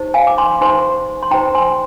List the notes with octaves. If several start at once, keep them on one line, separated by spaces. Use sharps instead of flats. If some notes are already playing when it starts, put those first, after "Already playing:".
Already playing: D#4 G4 C5
F5 G#5
D6
G#5 C6
D#4 G4 C5 G#5 C6
C6
D#4 G4 C5 G5 A#5
G#5 C6